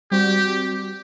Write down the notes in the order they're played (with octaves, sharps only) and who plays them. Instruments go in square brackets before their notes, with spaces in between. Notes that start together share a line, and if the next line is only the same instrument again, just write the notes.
[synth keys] G3 C4 F#4 [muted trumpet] G4